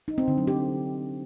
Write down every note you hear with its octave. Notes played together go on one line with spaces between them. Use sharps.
D#4
C4
D3
F#3
G4